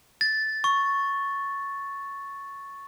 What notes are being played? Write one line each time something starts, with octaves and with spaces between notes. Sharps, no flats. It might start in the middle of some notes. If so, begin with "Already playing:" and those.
A6
C#6